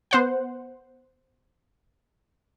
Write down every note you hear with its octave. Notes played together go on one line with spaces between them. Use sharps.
B3 C5 F#5